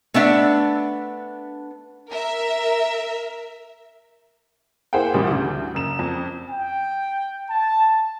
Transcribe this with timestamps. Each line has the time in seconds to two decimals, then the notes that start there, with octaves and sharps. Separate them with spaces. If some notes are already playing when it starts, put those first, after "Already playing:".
0.14 A3 B3 D4 E5
2.11 A#4 E5
4.93 A#3 E4 G#4 C5 F#5 G5
5.14 A1 A#2 E3 G3
5.31 D2
5.74 F#1 E7
5.99 F2
6.50 G5
7.50 A5